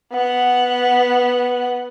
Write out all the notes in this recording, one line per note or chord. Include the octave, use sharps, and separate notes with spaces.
B3 F#5